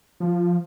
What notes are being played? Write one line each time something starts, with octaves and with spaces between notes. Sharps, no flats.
F3